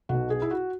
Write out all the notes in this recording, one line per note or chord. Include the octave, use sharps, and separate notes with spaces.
B1 B2 F#4
G#4
E4
F#4